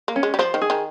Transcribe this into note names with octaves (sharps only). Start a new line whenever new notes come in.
A#3
C#4
G#3
G3
F3 C5
D#3
G#4
D#3